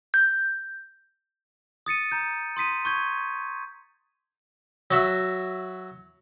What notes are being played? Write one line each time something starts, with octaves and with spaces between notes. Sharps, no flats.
G6
D#6 A6 C#7 D#7
A#5 G6
C6 D#6 B6 D#7
C#6 G6 G#6
F#3 F#4 E5